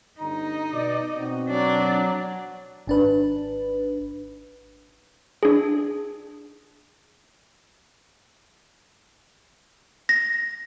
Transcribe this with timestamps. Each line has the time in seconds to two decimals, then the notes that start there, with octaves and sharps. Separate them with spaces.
0.20 G1 D3 D#4 A#5
0.72 B2 D5
1.15 B2 C4 F#4
1.50 F#3 D4
2.87 G#1 D4 B4
5.43 D4 G#4
10.09 A#6